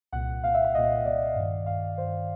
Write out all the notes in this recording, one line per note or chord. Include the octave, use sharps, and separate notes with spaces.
C2 A#2 F#5
C2 A#2 F5
E5
E5
C2 A#2 D#5
C2 A#2 D5
G2 D#3
G2 D#3 F5
G2 D#3 C5